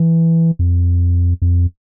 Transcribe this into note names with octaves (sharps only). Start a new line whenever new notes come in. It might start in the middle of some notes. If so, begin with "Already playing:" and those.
Already playing: E3
F2
F2